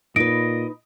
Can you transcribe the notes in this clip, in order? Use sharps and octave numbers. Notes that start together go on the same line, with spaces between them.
A#2 D#4 B4 D#5 D7